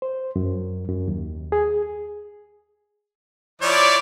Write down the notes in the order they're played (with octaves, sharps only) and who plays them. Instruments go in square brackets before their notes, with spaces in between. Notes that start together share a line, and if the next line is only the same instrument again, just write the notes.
[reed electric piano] C5
F#2
F#2
D#2
G#4
[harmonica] F3 E4 C#5 [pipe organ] D5